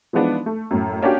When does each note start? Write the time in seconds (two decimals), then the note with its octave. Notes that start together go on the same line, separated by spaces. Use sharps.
0.13 E3 F3 G#3 B3 D4 D#4
0.46 A3
0.71 F#2 A2
1.02 A#3 C#4 D4 F#4 G4